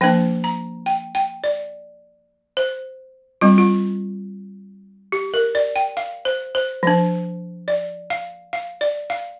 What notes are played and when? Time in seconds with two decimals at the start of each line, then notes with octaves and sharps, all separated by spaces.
0.01 F3 A#3 D4 G5
0.44 A#5
0.86 G5
1.15 G5
1.44 D5
2.57 C5
3.41 G3 C4 F4
3.58 F4
5.12 G4
5.34 A#4
5.55 D5
5.76 G5
5.97 F5
6.25 C5
6.55 C5
6.83 F3 D4
7.68 D5
8.10 F5
8.53 F5
8.81 D5
9.10 F5